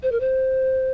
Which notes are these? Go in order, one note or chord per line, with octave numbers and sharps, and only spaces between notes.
C5
A#4
C5